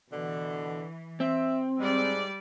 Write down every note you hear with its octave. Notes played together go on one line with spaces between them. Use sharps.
B2 D3 E3
C4 E5
G#2 G3 G#3 D5